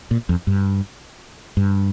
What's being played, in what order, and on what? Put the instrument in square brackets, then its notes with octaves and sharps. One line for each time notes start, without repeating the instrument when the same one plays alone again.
[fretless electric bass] A#2
F2
G2
G2